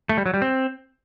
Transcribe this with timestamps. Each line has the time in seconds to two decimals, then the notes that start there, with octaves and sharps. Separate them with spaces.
0.09 A3
0.18 G3
0.26 F#3
0.34 G3
0.42 C4